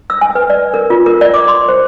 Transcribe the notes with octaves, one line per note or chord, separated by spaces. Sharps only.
E6
G#5
B4
D5
A#4
F4
A#4
D5
D6
C6
C5